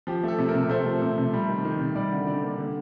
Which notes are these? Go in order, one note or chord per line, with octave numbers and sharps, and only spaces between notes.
F3 G4
A3 A4
C3
A#4
C3
A3 C5
F3
C3
C3
G3
D#3
D#3
C3
G3 D5
D3
D3 D5
A#3
D3